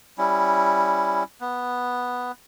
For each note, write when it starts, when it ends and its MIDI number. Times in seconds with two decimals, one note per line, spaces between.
0.18 1.24 55
0.18 1.24 61
0.18 1.24 64
1.41 2.32 59